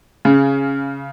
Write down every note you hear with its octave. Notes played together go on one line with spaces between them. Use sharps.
C#3